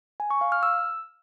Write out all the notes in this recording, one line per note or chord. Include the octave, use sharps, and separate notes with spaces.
G#5
C#6
F5
F6
E6